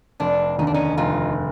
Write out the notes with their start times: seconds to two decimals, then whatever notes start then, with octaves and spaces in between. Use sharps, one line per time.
0.20 F1 C4 D4
0.59 D#2 D#4
0.62 D3 D4
0.74 C#4 D#4
0.97 F1 D#4 F4